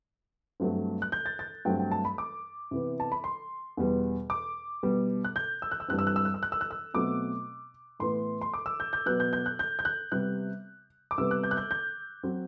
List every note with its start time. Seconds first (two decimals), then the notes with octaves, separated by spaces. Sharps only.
0.60 G2 F#3 A3 C4
1.02 F#6
1.12 G6
1.26 A6
1.39 A6
1.65 G2 F#3 A3 C4 G5
1.79 G5
1.92 A5
2.05 B5
2.18 D6
2.71 C3 E3 B3
3.00 A5
3.12 B5
3.24 C6
3.77 E2 B2 G3 B3
4.30 D6
4.83 B2 G3 B3
5.24 F#6
5.36 G6
5.62 E6
5.71 F#6
5.80 E6
5.88 G2 E3 G3 C4 F#6
5.99 E6
6.07 F#6
6.16 E6
6.25 F#6
6.34 E6
6.43 F#6
6.52 E6
6.61 F#6
6.71 E6
6.94 B2 F#3 A3 C4 D6
8.00 A2 E3 B3 C6
8.41 C6
8.54 D6
8.66 E6
8.80 G6
8.93 G6
9.06 B2 F#3 B3 F#6
9.20 G6
9.33 G6
9.46 F#6
9.59 G6
9.79 G6
9.85 F#6
10.12 C3 G3 B3 F#6
11.11 D6
11.18 C3 G3 B3 E6
11.31 F#6
11.43 G6
11.51 F#6
11.57 G6
11.71 G6
12.23 F#3 C4